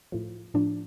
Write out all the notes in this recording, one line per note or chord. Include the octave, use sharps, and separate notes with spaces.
A2 F3
A2 F3 D4